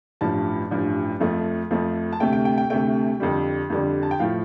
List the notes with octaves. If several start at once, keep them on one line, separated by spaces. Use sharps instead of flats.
A1 G2 F3 A5
A1 G2 F3
F2 F3 A3
F2 F3 A3
A5
D2 C3 A3 G5
G5
G5
G5
D2 C3 A3 G5
F2 D3 G3
F2 D3 G3
A5
G5
A2 F3 F5